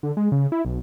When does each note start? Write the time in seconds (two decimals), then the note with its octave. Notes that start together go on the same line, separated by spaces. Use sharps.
0.03 D3
0.17 G#3
0.32 C#3
0.52 E4
0.65 B1